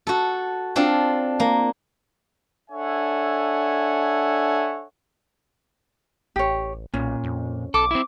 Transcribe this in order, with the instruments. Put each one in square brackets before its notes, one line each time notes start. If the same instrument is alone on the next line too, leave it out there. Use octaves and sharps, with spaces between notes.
[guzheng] F#4 A4
C4 D4 F4 A4
A#3
[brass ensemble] D4 A4 C#5 E5 F#5 G#5
[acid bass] A1 [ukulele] G4 C#5
[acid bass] B1 [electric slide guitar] A#2 [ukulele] C#4
[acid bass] F2
[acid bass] B1 [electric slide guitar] A4 [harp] D6
[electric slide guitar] C4 E4